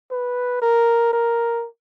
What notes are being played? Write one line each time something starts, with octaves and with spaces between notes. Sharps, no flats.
B4
A#4
A#4